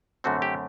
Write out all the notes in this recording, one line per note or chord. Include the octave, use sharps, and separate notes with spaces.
F#2 D3 A3 C4 F#4
G4